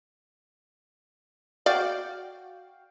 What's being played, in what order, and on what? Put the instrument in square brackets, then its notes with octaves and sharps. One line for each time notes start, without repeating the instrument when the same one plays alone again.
[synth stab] F#4 F5 G5 [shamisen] D5